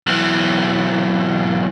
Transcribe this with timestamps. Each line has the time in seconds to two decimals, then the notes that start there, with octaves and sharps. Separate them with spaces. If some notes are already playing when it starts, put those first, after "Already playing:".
0.07 B1 E3